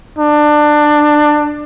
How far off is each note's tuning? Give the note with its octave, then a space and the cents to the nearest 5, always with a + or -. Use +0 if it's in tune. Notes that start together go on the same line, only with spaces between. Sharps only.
D4 +20